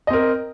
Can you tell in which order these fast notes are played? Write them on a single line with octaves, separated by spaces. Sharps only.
D#5 C4 A#4